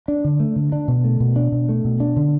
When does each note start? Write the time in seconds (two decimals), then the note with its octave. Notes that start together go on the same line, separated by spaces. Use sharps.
0.08 D4
0.24 D3
0.40 A3
0.56 D3
0.72 D4
0.88 B2
1.04 A3
1.20 B2
1.36 D4
1.52 B2
1.69 A3
1.85 B2
2.00 D4
2.16 D3